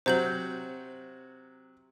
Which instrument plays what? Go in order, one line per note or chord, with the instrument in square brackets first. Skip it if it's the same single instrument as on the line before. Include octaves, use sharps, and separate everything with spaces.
[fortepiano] C3 F#3 [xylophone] C5 G6 F#7